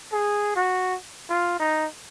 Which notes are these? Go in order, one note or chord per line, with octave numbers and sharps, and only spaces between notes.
G#4
F#4
F4
D#4